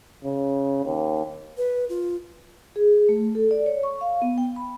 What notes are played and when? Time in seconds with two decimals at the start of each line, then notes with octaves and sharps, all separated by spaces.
0.25 C#3
0.85 D#2
1.57 B4
1.89 F4
2.76 G#4
3.09 A3
3.35 A4
3.51 D5
3.66 C#5
3.83 C#6
4.01 F5
4.22 B3
4.38 G5
4.56 B5